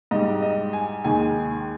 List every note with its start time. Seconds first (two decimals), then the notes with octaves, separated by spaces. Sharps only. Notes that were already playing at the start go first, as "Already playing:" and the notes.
0.11 G#2 G3 D#5
0.42 D#5
0.73 G#5
1.04 D#2 D#3 G#3 G#5